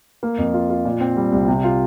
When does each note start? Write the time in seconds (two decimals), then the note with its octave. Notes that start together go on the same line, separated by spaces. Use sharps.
0.23 A#3
0.38 F2
0.54 F4
0.70 F4
0.85 A#2
1.00 C4
1.17 G3
1.32 C2
1.48 C3
1.64 F4